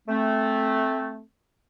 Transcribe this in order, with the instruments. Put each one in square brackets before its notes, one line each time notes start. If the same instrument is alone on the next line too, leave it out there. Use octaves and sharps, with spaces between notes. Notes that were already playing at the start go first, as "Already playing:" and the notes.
[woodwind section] A3 C4